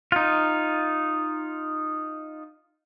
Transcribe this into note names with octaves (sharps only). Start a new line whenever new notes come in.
D#4 F4